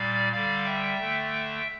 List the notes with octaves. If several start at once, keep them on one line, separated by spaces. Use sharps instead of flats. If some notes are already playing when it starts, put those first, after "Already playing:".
Already playing: A#2 G3 D5 F5
D3 G3 D5 F5
E5 G5
D3 A3